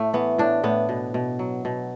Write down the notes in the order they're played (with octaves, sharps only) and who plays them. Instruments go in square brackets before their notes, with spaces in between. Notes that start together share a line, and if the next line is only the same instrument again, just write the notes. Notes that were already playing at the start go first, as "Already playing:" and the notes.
Already playing: [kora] A2 A3
E3 B3
A2 D4
A2 B3
B2
B2
F#3
B2